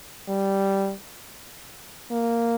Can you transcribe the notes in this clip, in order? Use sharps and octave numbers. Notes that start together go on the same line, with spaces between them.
G3
A#3